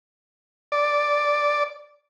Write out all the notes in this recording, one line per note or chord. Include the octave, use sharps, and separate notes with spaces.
D5